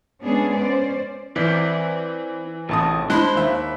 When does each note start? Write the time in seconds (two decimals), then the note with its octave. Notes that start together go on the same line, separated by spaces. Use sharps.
0.21 G#3 B3 C#4 D4 G#4
0.53 C#4 C5 D5
1.36 E3 C4 E4 D5
2.69 A1 A2 C3 A5 D#6
3.10 G#3 D4 E4 C5 B5 F#6
3.35 D#2 E5